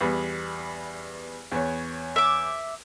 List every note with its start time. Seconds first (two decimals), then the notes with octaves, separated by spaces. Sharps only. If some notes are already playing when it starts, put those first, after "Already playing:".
0.01 E2 G3 B3
1.52 E2 B4 C#5
2.16 E5 D6